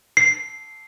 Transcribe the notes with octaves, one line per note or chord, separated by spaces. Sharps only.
C7